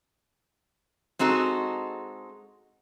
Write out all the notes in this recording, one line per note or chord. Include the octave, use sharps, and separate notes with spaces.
G#3 C4 D#4 F#4 A4